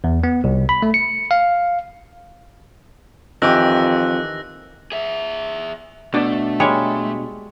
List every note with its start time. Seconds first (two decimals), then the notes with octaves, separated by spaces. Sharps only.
0.04 E2
0.24 B3
0.44 C2
0.69 B5
0.82 A3
0.94 C#7
1.31 F5
3.42 F2 D#3 E3 G4 E6 F#6 A#6
4.92 G#4 E5
6.14 B2 A3 D4
6.60 G3 G#3 C#5